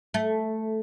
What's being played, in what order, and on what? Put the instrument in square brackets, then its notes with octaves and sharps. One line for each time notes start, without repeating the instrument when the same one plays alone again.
[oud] A3